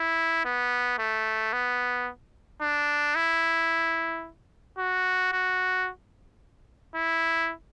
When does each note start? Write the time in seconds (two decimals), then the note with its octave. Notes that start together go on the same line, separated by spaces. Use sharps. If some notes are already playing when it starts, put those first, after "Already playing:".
Already playing: E4
0.45 B3
0.98 A3
1.53 B3
2.61 D4
3.15 E4
4.78 F#4
5.32 F#4
6.95 E4